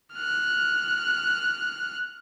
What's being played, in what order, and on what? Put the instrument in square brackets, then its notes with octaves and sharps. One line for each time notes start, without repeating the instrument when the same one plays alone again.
[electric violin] F6 F#6